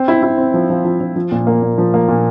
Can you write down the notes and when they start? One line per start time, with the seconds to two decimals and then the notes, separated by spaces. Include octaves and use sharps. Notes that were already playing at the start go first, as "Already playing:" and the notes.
Already playing: C4
0.08 E4
0.23 E4
0.38 C4
0.54 F3
0.70 F3
0.85 F3
1.01 F3
1.16 F3
1.32 A#2
1.47 A#3
1.62 A#2
1.78 F3
1.94 A#3
2.08 A#2